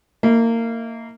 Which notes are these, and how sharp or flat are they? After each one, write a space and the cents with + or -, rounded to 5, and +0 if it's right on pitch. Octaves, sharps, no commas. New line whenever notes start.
A#3 -25 E4 -45